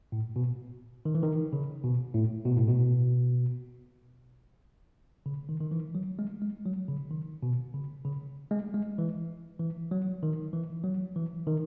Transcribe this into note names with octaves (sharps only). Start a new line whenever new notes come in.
A2
B2
D#3
E3
D#3
C#3
B2
A2
B2
A2
B2
C#3
D#3
D#3
E3
F#3
G#3
G#3
F#3
C#3
D#3
B2
C#3
C#3
G#3
G#3
E3
E3
F#3
D#3
E3
F#3
E3
D#3